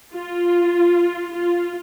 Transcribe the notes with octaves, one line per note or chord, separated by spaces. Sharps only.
F4
F4